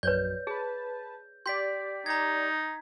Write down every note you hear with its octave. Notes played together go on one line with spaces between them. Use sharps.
A#1 F#2 B4 C#5 D5 G6
G#4 B4 A5
G4 D5 C6 G6 B6
D#4 A#5 G#6